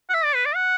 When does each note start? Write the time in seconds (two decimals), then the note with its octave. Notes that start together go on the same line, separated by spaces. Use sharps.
0.10 F#5
0.14 E5
0.24 D5
0.35 B4
0.46 D5
0.55 F#5